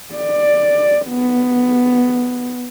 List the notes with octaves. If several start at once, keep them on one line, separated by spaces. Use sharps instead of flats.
D5
B3